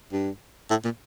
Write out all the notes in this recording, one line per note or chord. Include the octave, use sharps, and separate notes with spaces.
G2
A2
A#2